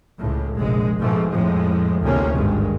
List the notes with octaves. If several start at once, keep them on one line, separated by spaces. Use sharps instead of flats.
C#2 A2
F1 A#1 G#3
G#2 B2 F3 A3
F2 A2 F3 G#3
A1 D2 C3 A#3 C#4
G#1 G2 G#3